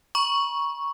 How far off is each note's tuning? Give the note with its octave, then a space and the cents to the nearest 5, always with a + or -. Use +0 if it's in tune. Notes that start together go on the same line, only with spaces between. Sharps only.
A#5 +45 C#6 +0